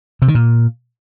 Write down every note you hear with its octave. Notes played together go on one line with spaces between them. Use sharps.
C3
D#3
A#2